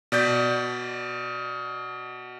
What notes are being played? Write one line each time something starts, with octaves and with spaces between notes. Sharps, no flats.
B2 D5 G6 B6